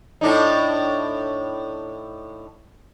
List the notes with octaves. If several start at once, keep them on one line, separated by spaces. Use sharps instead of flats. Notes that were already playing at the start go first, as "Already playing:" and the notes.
A2 D4 D#4